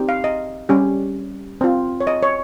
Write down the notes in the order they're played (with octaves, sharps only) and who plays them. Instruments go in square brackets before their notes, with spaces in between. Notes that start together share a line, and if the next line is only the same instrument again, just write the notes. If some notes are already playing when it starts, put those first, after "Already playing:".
Already playing: [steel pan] C4 D#4 G4
F5
D#5
G3 C#4 G4
C4 F4
C#5
D#5
C#5